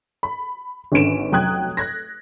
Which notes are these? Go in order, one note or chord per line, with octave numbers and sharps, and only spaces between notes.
B5
G#1 D3 C#4 B4 D7 E7
F1 F#3 G5 D#6 F#6 G#6
F#6 G#6 A#6